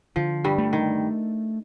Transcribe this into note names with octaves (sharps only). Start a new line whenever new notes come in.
D3 F3
G2 G3
A3
D#3